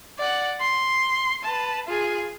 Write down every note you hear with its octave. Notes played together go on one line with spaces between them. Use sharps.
D5 F#5
C6
B4 A5
F4 G#4